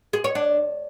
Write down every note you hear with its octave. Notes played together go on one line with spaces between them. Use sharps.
G#4
C#5
D4